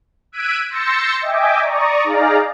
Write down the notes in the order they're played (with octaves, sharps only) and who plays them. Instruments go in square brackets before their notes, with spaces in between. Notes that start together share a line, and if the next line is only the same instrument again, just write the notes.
[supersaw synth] E6 F#6 G#6 B6 D7 D#7
C6 E6 G6 A6 A#6 C#7
D#5 E5 G5 G#5 D6
D5 A#5 C#6 D#6
D#4 G#4 D5 F5 A#5